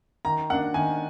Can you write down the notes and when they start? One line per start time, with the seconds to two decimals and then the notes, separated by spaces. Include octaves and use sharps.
0.25 D#3 A#5
0.50 A#3 F#5
0.53 D4
0.74 D#3 G#5